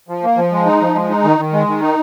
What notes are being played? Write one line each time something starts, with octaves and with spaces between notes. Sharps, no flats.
F3
A#3
F3
G#3
D#4
F3
G#3
D#4
D#3
D#3
G#3
D#3
D#4